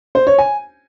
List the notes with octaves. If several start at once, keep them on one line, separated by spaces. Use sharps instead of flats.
C5
C#5
G#5